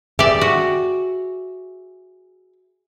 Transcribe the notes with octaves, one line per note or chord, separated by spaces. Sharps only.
G4 G#4 D5 E5
F#4